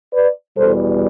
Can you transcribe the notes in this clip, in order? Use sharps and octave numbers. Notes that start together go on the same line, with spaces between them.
B4 D5
E2 B2 G3 A4 C5